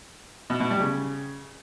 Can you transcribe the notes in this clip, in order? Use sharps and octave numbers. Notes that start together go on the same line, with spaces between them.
B2
B2
G3
C#3